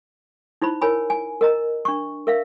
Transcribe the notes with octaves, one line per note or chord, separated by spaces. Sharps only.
D#4 E4 C5 B5
A#4 C#5 G#5 B5
G#5
A#4 D#5 A#5
D4 C#6
A#4 E5 F5